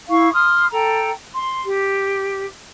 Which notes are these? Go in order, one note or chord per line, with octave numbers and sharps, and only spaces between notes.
E4 F5 C#6
C6 D#6 F6
A4 G5 A#5
C6
G4